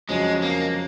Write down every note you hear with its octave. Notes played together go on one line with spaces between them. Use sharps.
F2 C#3 F#3 G#3 C#4
A#3